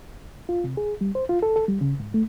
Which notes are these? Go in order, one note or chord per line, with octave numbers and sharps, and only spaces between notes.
F4
C3
G#4
G3
C5
F4
A4
A4
G3
C#3
G#2
A3